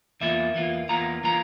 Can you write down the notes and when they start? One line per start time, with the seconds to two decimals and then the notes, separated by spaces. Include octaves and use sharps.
0.21 E2 E3 A#3 F4 E5
0.55 E2 E3 A#3 F4
0.89 E2 E3 A#3 F4 A#5
1.24 E3 A#3 F4 A#5